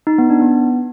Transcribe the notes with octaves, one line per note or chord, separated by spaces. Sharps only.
D#4
B3
D4
B3